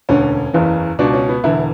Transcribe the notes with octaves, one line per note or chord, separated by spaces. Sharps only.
E1 D2 D3 C#4
F#1 E2 C#3 E3
C#2 B2 D4
C#4
B3
E1 E2 D3 E4